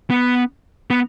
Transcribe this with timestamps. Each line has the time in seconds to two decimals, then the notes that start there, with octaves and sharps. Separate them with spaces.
0.10 B3
0.90 B3